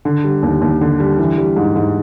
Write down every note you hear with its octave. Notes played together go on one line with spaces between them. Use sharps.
D3
G3
D#2
D#2
D3
G3
E3
G3
G#2
G#2